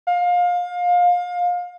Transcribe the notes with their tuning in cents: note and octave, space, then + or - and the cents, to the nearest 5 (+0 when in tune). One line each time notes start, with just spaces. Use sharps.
F5 +25